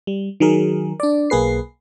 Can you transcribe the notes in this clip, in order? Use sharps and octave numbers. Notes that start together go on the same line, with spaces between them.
G3
D#3 F#3 G#4 A#4
D4 D5
B1 A#3 G#4 B4 C7